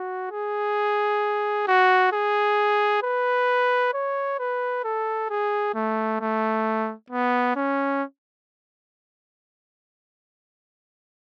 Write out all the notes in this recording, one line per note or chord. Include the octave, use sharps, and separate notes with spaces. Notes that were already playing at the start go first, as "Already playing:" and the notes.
Already playing: F#4
G#4
F#4
G#4
B4
C#5
B4
A4
G#4
A3
A3
B3
C#4